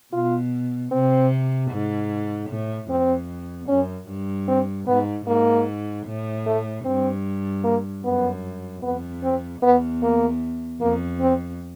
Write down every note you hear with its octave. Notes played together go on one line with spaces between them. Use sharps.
B2 F4
C3 C4
G#2
A2
F2 C4
F#2 C#4
G2
C4
G#2 B3
G#2 A#3
A2
A3
G2 C4
A#3
F#2 B3
F2 B3
C4
E2 B3
A#3
F2 A#3
C4